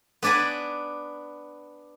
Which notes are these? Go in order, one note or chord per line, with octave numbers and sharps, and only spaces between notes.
B3 D4 D5 G#5 B5